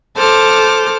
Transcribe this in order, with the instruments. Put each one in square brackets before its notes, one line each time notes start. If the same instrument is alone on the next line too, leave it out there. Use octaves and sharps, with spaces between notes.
[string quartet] A4 C5 D6 F6